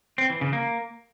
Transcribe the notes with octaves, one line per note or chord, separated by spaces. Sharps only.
C4
E3
C#3
A#3